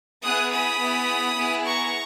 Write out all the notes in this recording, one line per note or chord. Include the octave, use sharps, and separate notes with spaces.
B3 E4 G#4 D#6 F#6
B5 D#6
B3 E4 G#4
B3 E4 G#4
A#5 C#6